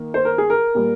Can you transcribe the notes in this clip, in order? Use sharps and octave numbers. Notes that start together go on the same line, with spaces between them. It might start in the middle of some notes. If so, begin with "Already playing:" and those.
Already playing: D#3 A#3
C5
A#4
G#4
A#4
A#2 G3 A#3